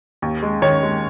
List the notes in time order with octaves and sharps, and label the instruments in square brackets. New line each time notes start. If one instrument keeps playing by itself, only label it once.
[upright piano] D#2
G#3
D#3 C#5
G#3